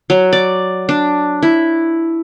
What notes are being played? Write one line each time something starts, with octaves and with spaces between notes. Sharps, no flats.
F#3
D5
D4
E4